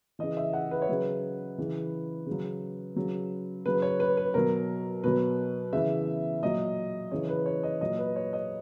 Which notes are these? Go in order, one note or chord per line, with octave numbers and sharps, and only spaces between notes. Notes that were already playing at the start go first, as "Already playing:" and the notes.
C#3 E3 D#5
E5
F#5
B4
C#5
C#3 F#3 B4
C#3 E3
C#3 F#3
C#3 F#3
C#3 F#3 B4
C#5
B4
B4
B2 F#3 A#4
B2 F#3 B4
C#3 E3 E5
A#2 F#3 D#5
C#3 E3 C#5
B4
C#5
D#5
A#2 F#3 D#5
B4
C#5
D#5